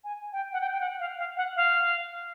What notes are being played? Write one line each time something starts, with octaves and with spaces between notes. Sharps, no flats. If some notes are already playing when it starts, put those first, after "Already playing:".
G#5
G5
F#5
G5
G5
F#5
F5
F5
F#5
F5